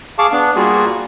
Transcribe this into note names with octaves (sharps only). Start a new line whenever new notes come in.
G#4 F5 A5 C#6 D6
B3 D4
G3 A#3 F4 F#4 G#4